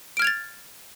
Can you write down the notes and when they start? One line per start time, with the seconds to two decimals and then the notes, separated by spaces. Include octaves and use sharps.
0.17 D7
0.19 F6
0.22 G#6
0.24 F7
0.27 A6